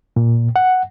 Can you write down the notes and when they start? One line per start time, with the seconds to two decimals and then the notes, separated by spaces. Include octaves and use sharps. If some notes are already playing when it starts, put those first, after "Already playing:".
0.16 A#2
0.56 F#5